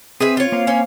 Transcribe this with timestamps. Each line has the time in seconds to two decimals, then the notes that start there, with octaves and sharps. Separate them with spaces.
0.20 C4 G#4 B4 E5
0.37 F4 C#5
0.52 A#3 C4 F5
0.67 C#4 C#5